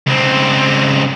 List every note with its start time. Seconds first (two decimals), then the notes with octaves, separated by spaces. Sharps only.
0.07 C#2 C4